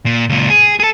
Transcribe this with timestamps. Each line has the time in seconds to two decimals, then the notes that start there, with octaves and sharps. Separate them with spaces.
0.06 A#2
0.29 C#2 A#2
0.50 G#4
0.80 G#4 A4